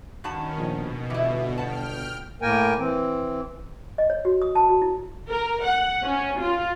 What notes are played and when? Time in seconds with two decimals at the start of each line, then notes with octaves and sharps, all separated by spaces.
0.24 G2 D#3 C#4 F#4 A5
0.58 A#1 B2
1.10 G1 E3 E4
1.57 F#5 G5 A5 F6
2.42 A2 A#3 A#4 G5 G#5
2.79 E3 C4
3.98 D#5
4.10 C#5
4.25 F#4
4.42 D#6
4.55 A5
4.69 F#4
4.82 E4
5.30 A#4
5.64 F#5
6.04 C#4
6.41 F4